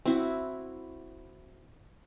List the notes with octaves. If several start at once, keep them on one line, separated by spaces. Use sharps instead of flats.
C4 E4 F#4